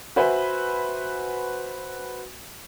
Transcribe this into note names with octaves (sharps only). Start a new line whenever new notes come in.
F#4 B4 C5 E5 G#5